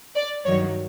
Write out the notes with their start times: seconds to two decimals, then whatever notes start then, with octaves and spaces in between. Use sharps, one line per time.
0.16 D5
0.45 G2 D#3 F#3 C#5